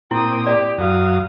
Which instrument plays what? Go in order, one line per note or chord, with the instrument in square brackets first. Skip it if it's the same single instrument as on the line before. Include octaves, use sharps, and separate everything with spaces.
[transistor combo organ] A#2 C4 [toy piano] E4 [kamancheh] G5 D#6
[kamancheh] G4 [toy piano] D5
[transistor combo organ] F#2 [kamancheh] F5 D#6